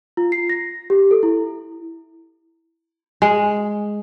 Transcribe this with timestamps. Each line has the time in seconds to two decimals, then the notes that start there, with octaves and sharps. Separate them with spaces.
0.17 F4
0.32 C7
0.49 A#6
0.90 G4
1.11 A4
1.23 E4
3.22 G#3